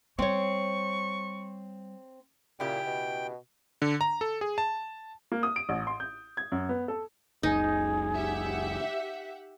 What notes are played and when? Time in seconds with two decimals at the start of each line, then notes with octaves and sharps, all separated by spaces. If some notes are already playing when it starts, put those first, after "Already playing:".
0.19 G3 C4 C#5 C#6
2.60 A#2 C#3 E4 G4 G5
2.86 B2
3.82 D3
4.01 A#5
4.21 A4
4.41 G#4
4.58 A5
5.32 A#3
5.43 D#6
5.56 D7
5.69 A1
5.87 C6
6.00 G6
6.37 G#6
6.52 F#2
6.69 B3
6.88 A4
7.43 F#1 C#2 D#4 G#4
8.16 G4 E5 F#5